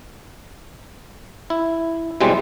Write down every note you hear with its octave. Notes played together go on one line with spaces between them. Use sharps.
E4
B2 E3 G3 G#3 C4